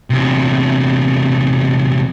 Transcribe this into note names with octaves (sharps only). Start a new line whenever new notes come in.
E2 C3